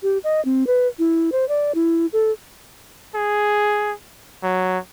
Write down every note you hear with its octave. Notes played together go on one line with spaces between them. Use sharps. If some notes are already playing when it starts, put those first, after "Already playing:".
G4
D#5
C4
B4
E4
C5
D5
E4
A4
G#4
F#3